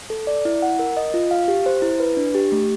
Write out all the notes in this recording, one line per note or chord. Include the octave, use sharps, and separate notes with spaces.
A4
D5
E4
F#5
A#4
D#5
F4
F5
G4
C5
E4
B4
D4
G4
A3